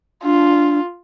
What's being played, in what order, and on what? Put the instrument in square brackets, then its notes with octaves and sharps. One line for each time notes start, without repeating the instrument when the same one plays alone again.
[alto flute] D4 [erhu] F4